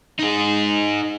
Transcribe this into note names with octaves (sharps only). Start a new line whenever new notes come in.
D#4 G#4